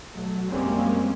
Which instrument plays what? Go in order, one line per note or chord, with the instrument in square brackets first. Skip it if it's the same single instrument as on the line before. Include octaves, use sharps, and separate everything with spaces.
[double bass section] B2 F#3 A3
F#2 G3 G#3 A#3 C4 C#4